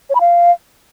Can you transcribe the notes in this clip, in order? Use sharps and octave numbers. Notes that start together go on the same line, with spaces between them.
C#5
B5
F5